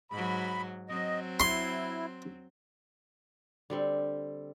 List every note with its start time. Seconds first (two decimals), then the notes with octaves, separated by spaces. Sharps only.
0.11 G#2 F#3 B5
0.89 F#3 C4 D#5
1.40 E4 C6
3.70 D3 G3 C4